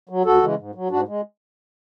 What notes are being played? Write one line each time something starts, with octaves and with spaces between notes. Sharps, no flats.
F#3
D2 F#4 A4
C#3 E3 G#3
G#2
F#3
G#2 D4 F#4
G#3